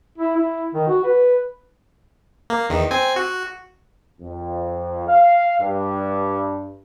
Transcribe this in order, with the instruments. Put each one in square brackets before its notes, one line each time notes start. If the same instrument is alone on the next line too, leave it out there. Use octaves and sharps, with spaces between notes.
[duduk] E4
E4
D#3
F#4
B4
[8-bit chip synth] A#3
E2 D#3
C4 G#5
F#4
[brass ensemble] F2
F5
G2